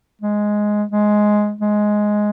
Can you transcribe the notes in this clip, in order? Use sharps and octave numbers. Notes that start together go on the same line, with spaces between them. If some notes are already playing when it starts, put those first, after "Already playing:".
G#3
G#3
G#3